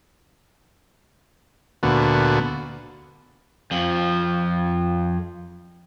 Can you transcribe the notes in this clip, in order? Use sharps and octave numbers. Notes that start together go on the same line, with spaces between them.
D2 A#2 D3 B3 F#4
F2 F3